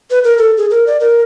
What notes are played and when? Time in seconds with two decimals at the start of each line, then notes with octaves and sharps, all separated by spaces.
0.11 B4
0.24 A#4
0.38 A4
0.57 G#4
0.70 A#4
0.87 D5
1.00 A#4